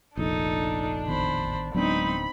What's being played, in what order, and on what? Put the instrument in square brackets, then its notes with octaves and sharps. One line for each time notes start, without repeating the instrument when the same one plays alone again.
[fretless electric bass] F1 A#1 [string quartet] D4 [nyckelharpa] D#4 A4
[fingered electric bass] A1 D#3 B3 [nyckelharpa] C5 B5
[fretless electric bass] D1 B3 D4 [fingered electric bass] F#3 G#3 [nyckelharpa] C4 D#4 [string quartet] B5